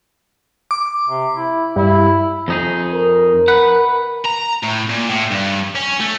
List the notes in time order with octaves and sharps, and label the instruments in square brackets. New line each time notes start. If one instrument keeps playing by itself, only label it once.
[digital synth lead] D6
[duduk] C3
E4
[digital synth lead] G2 [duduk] E4
[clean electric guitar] F2 D#4 G#4
[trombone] A#4
[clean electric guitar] B4 F#5
[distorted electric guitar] A#5
A2
A#2
A2
G2
C#4
A3